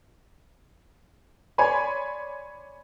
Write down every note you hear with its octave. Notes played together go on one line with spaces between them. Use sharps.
C#5 D5 G#5 B5 C6